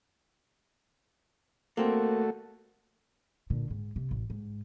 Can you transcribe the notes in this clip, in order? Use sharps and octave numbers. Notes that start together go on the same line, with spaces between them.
A3 A#3 C4 F#4 A4
A#2 D3
G#2
C3
A1
G#2